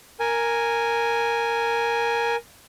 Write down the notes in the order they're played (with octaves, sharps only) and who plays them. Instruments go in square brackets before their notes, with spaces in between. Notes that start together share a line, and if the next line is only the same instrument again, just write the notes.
[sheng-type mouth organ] A#4 G#5